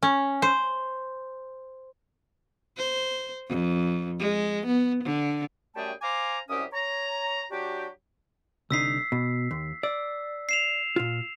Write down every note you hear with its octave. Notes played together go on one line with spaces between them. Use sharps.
C#4
C5
C5
F2
G#3
B3
D3
F#2 G3 A3 G#4 G5 A5
C5 F5 G#5 A#5 C6 D6
C2 F#2 C#4 G4 D#6
C#5 A#5
F#3 D4 F#4 G4
C2 D3 D#4 E6 B6 C7
B2
D#2
D5 E6
C7 E7 F7
A#2 F4